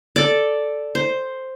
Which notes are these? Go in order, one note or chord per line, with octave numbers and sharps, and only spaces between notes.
A4 D5
C5